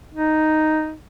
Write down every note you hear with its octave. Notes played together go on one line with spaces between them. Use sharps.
D#4